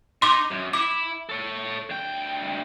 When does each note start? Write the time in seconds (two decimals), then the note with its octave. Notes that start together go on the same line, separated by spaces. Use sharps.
0.22 D#4 C6 D6
0.51 F#2
0.73 E4 D6
1.29 A4 C#5
1.90 D2 G5